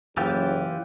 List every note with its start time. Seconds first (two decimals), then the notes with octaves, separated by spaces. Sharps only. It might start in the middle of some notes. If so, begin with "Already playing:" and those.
0.17 F#1 E3 F4 G4